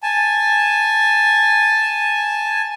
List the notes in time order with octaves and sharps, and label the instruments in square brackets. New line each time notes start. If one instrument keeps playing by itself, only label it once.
[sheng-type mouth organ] G#5 A5